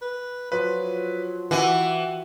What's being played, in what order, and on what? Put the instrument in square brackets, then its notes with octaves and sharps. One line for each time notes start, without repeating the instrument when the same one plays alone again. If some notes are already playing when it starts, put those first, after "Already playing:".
[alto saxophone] B4
[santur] F3 [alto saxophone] F#3 [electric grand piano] B4
[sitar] E3 [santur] F#4 G4 E5 [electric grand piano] F#5